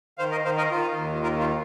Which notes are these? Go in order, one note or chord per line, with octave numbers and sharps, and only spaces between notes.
D#3 C5 F5
A#4 D#5
D#3 C5 F5
A#4 D#5
D#3 F4
D#2
D#3 F4 A#4
F4